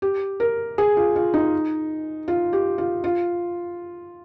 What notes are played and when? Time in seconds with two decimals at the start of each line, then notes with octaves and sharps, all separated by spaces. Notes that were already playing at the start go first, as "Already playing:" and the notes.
0.02 G4
0.40 A#4
0.78 G#4
0.97 F4
1.16 F4
1.34 D#4
2.28 F4
2.53 G4
2.78 F4
3.04 F4